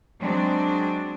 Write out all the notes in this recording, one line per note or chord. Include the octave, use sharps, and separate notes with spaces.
F#3 G#3 C4 D4